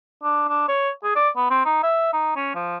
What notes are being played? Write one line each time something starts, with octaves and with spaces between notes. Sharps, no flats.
D4
D4
C#5
G#4
D5
B3
C4
D#4
E5
D#4
C#4
F3